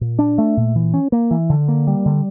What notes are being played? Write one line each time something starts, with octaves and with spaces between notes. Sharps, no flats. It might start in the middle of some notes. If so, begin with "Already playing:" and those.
A#2
D4
A3
A#2
E3
C#4
A#3
E3
D3
A#3
G3
D3